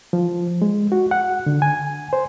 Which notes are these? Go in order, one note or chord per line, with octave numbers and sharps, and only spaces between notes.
F3
G#3
F#4
F#5
D3
G#5
C5